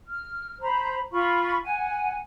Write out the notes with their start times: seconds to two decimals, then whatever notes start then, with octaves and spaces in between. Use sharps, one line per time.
0.07 F6
0.60 C5 A#5 B5
1.12 F4 B5 C#6
1.63 F#5 G#5